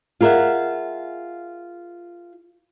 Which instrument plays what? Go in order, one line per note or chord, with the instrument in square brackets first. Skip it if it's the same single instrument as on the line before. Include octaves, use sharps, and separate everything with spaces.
[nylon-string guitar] F4 G#4 A#4 C#5 E5 F#5